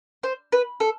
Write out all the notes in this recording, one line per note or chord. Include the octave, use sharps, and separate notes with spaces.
C5
B4
A4